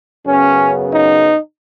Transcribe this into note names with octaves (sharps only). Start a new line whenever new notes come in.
F#2 C#3 B3 C#4
D#4